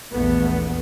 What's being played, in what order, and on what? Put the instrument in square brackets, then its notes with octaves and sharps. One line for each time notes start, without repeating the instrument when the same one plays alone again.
[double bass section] A#1 E2 A3 B3